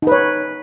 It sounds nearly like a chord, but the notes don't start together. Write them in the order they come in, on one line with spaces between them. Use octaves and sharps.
D#4 B4 C#5